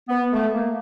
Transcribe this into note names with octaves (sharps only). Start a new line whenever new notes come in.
B3
A3
A#3